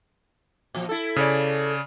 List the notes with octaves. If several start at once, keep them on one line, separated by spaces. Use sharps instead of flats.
A#2 F3
E4 A4
C#3 C#5 D5